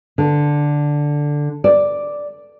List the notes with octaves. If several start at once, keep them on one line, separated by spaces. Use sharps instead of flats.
D3
D5